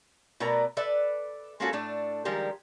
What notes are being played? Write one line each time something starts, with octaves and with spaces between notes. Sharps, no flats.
B2 A3 B3 A#4 D5 A#5
A4 B4 D5 E5
G#3 A#3 C#4 F4 F#4 A4
A2 A3 D4 A4
D#3 F3 G3 G#3 G4 A#4